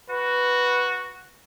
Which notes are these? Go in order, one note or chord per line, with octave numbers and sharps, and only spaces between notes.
F#4 B4